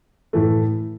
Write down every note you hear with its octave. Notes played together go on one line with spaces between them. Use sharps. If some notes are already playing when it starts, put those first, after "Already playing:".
A2 E3 A3